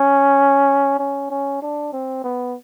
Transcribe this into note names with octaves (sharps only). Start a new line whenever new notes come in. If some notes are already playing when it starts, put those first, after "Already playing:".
Already playing: C#4
C#4
C#4
D4
C4
B3